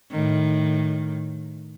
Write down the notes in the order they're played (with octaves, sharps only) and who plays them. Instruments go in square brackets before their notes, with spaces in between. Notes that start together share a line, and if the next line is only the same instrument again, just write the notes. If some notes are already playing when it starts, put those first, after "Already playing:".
[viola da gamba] A2 D#3